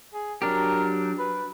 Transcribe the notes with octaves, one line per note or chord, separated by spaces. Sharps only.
G#4
F#3 D4 G4 A#4
B4